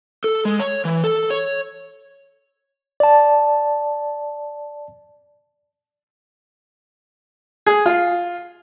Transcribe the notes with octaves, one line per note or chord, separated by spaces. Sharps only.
A4
G#3
C#5
E3
A4
C#5
D5 A5
G#4
F4